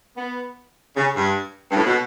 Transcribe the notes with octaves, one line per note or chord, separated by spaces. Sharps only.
B3
C#3
G2
G2
A2
B2